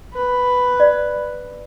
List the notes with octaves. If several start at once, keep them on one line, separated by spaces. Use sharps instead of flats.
B4
D5